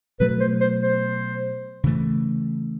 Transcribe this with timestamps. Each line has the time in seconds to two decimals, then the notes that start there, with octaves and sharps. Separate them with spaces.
0.20 B2 F#3 A3 B4
0.40 C5
0.61 C5
0.82 C5
1.84 C#3 E3 A3